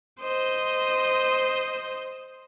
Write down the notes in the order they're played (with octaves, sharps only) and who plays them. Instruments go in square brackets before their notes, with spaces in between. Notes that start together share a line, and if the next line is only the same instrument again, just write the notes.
[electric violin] C5 D#5